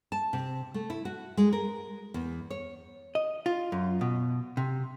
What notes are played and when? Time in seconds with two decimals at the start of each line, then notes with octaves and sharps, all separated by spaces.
0.12 A5
0.33 C3
0.74 A3
0.90 E4
1.05 F#4
1.37 G#3
1.53 A#4
2.14 E2
2.50 C#5
3.15 D#5
3.46 F4
3.72 F#2
4.01 B2
4.57 C3